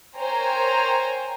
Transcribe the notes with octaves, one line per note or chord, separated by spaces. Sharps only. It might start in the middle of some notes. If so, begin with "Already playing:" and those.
A#4 C5 C#5 G5 G#5 A#5